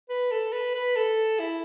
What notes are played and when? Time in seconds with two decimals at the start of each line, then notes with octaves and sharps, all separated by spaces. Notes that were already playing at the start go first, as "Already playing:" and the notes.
0.09 B4
0.31 A4
0.52 B4
0.74 B4
0.96 A4
1.39 E4